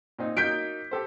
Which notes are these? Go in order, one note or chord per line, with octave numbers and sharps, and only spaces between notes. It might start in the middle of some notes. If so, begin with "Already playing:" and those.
A#2 C4 D#4
F#3 A#3 D#4 G6 B6 D7
G4 A4 C5